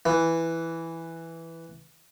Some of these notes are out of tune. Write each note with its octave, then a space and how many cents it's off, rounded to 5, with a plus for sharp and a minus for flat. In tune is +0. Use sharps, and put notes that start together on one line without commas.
E3 +0